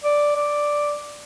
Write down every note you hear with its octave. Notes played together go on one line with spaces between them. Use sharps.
D5
D5